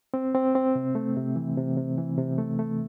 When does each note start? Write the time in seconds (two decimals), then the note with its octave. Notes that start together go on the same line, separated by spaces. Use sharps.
0.14 C4
0.34 C4
0.55 C4
0.75 C3
0.95 A3
1.17 C3
1.36 E3
1.57 C3
1.77 C3
1.98 E3
2.18 C3
2.38 A3
2.59 A3